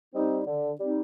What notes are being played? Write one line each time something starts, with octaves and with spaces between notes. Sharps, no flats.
G3 C4 D#4
D3
G3 C4 D#4